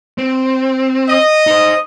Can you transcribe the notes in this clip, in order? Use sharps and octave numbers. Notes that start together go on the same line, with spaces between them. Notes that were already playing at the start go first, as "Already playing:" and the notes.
C4
D#5
D#4 C5